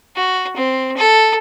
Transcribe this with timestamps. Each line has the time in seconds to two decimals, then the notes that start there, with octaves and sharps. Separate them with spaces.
0.16 F#4
0.56 C4
0.97 A4